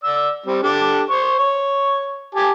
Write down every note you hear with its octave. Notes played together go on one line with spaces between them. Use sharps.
D5 E6
G3 C4
D4 G4 A4
C5 C#6
C#5
G4 G#5 A5